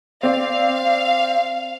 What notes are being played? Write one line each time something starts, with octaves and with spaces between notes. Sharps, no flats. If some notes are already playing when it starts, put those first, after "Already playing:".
C4 D5 F5